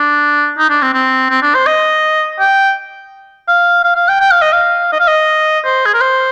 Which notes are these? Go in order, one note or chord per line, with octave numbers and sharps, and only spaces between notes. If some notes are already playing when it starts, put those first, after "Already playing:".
Already playing: D4
D#4
D4
C4
C4
C4
D4
C5
D#5
G5
F5
F5
F5
G5
G5
F5
D#5
F5
D#5
F5
D#5
C5
G#4
A#4
C5